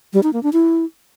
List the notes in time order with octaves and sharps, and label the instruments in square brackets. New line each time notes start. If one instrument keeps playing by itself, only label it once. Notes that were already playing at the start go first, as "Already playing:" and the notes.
[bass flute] G3
D#4
A#3
D4
E4